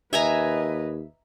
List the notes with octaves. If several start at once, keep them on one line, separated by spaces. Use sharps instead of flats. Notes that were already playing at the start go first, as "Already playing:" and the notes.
D#2 B4 D#5 E5 G#5 A#5